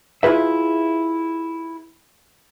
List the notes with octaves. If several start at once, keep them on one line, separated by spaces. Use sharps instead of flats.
E4 F4 G#4 B4 E5